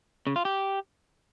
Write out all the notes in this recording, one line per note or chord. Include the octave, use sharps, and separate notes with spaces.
C#3
F4
G4